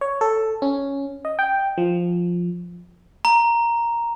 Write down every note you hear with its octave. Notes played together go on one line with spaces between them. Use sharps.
C#5
A4
C#4
D#5
G5
F3
A#5